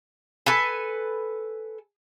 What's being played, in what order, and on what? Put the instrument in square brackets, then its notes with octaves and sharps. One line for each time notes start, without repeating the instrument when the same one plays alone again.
[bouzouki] A4 B4 G#5